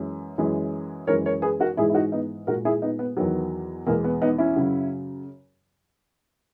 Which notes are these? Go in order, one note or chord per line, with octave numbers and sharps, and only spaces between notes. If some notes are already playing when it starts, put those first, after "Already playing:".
Already playing: F#2 E3 G#3
F#2 E3 G#3
F#2 E3 G#3 A#4 C#5
A#4 C#5
G#4 B4
F#4 A#4
G#2 E3 G#3 E4 G#4
E4
D#4 F#4
B3 D#4
A#2 G#3 F#4 A#4
E4 G#4
B3 D#4
B3
E2 D#3 F#3 B3
E2 B2 G#3 A#3
B3
B3 D#4
C#4 E4
F#2 C#3 F#3